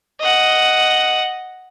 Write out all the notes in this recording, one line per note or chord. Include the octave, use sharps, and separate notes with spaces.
D#5 F#5